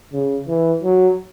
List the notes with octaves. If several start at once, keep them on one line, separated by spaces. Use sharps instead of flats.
C#3
E3
F#3